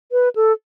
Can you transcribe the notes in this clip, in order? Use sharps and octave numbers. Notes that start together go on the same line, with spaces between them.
B4
A4